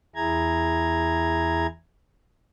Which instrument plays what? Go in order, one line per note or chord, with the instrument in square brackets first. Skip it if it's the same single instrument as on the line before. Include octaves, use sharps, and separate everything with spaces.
[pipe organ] E2 E4 G#4 A#5 G#6